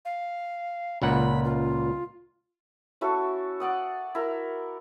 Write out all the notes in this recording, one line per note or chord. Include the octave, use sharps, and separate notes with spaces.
F5
C#2 A#2 F#5 B5
F4
C#4 E4 F#4 A4
D5 F#5 D#6
E4 A#4